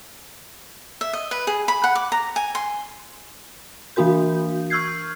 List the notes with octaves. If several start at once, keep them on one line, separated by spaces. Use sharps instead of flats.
E5
D#5
B4
G#4
B5
F#5
D6
A#5
G#5
C6
E3 A#3 D4 F#4 A#4 G6
C#6 E6 F6 G6 G#6 C7